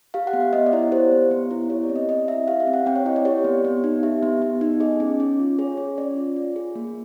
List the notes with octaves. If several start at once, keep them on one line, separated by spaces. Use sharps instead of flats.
G4 F5
F#5
B3
E5
B3 D#5
D5
E4
C#5
G4 C5
B3
B3
E4
G4 C#5
D5
C4
D#5
C4 D#5
E4 E5
G4 F5
F5
C4
F#5
C4 G5
C#5
E4 D#5
D5
G4 C#5
B3
B3
D#4
G4 E5
B3
B3
D#4
G#4 D#5
C#4
C#4
F4
G#4 C#5
C#4 C#5
C#4 D5
F4
F4
G#4
A#3